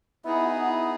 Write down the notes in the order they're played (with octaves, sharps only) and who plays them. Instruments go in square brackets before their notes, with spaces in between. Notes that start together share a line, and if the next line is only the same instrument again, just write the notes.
[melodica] B3 D#4 G#4 [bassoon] E4
[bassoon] F#4
E4